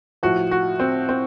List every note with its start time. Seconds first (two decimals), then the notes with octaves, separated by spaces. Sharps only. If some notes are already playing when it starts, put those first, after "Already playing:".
0.23 A2 F3 F#4
0.51 F#4
0.80 C4
1.09 C4